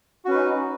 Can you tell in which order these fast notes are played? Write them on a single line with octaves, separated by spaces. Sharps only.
F#4 C#4 B4 D#4